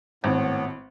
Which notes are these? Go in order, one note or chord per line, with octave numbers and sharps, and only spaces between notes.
G#1 A2 B3